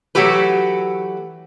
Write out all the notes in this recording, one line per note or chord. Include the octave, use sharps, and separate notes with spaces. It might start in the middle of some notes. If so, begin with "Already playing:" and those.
E3 F#3 A3 F#4 G4 B4